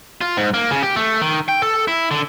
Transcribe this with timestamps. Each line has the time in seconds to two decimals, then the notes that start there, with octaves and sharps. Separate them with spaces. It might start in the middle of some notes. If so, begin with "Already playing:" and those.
0.21 F4
0.37 G#2
0.54 A#3
0.71 C#3
0.83 G4
0.96 A3
1.21 D#3
1.48 G5
1.62 A4
1.88 E4
2.11 D3